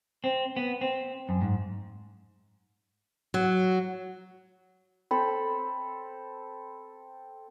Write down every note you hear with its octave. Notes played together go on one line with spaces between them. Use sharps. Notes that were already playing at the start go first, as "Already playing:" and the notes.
C4
B3
C4
F#2
G#2
F#3
C4 A4 B5